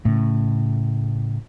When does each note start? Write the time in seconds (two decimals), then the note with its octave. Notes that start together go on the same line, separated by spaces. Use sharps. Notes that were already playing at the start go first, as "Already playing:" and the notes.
0.05 A2 C#3